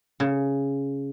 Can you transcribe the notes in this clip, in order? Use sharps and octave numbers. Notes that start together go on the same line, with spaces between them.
C#3